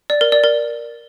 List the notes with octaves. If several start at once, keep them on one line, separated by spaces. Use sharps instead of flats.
D5
A#4
D5
A#4